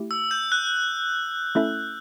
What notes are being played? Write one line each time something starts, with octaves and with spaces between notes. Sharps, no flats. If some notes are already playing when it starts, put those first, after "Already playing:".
Already playing: A3 E4 G4
E6
G6
F#6
A3 C#4 E4 A4 E5